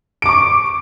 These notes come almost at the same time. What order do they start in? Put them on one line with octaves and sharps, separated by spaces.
D7 D6 C#6